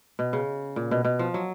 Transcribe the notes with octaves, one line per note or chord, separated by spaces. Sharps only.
B2
C#3
A#2
B2
B2
F3
F#3